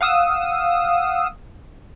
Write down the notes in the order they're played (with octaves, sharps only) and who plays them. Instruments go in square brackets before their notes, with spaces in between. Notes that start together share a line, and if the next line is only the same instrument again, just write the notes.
[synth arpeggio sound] F5 F#5 D#6 E6